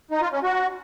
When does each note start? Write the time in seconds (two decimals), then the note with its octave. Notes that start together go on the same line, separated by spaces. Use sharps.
0.11 D#4
0.22 F4
0.32 C#4
0.43 F#4